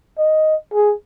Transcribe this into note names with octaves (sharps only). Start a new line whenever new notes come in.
D#5
G#4